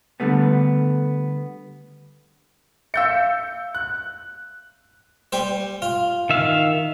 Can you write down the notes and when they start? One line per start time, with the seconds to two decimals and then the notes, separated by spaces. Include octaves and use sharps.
0.20 D3 G3 A3 B3
2.94 E5 F5 E6 G6 C#7
3.75 F#6
5.32 G3 C5
5.82 F4
6.30 D#3 E5 F5